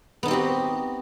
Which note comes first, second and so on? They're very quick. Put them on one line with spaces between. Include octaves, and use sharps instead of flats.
B3 D#4 C4 G4 F#4